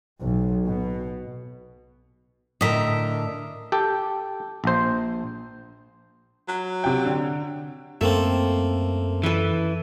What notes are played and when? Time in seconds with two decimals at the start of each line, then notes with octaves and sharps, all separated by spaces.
0.21 B1
0.66 B2
2.61 A2 D3 A#4 D#5 E5
3.72 G4 A4 G5
4.64 A#1 C5
6.48 F#3
6.84 C3 G5
7.05 D3
8.01 F#2 A3 A#3 C4 A4
9.23 E3 A4 B4